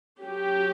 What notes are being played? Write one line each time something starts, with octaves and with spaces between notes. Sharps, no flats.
F#3 C#4 G4